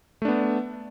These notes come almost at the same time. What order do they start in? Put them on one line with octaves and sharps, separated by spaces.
A3 D4 B3